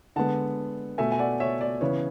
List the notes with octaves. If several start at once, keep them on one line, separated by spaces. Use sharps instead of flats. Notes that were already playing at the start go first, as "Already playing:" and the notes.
D3 G#3 B3 F#5 A5
B2 A3 E5 G#5
G#5
D5 F#5
C#5 E5
D5
C#3 E3 B3 C#5